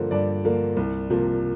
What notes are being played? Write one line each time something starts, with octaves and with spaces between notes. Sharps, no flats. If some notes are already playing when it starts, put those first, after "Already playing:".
Already playing: G2 D3 F3 A#3 C5
G2 D5
D3 F3 A#3
C2
C3 F3 A#3